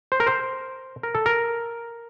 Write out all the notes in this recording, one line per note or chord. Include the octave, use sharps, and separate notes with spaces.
C5
A#4
C5
A#4
A4
A#4